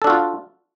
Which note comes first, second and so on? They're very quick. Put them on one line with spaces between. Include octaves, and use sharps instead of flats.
A4 D4 F#4 F4